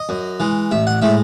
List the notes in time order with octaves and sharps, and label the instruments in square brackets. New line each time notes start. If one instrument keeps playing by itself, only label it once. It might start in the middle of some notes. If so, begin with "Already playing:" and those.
Already playing: [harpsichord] D#5
F#2
E3 G#3
A1 E5
F#5
A2 G#3 E5